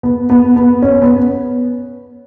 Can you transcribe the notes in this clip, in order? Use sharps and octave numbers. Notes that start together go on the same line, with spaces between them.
B3
B3
B3
C#4
B3